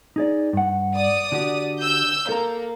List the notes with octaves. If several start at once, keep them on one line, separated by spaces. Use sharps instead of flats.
D#4 G#4 D5
G2 F#5
D5 D#6
D3 F#4 G4
E6 G6
A#3 A4 A#4 A#5